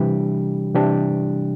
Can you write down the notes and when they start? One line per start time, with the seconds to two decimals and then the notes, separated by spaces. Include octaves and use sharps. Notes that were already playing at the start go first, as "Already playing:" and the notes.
Already playing: C3 E3 G3 D4 G4
0.75 C3 E3 G3 D4 G4